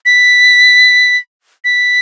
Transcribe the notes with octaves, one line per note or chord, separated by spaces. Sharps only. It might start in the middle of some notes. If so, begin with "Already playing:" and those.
B6
B6